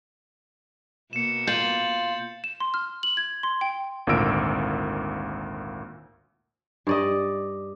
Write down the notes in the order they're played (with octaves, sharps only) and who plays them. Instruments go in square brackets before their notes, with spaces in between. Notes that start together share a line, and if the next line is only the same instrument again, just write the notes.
[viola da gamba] B2 A#3 [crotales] C#7 E7
[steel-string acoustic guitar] F4 [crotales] G6 A6 F#7
[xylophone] E7
C6
F6
F#7
G#6
C6
G5
[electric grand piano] G#1 D2 A#2 A#4 E6 D7
[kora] G2 D5 D#5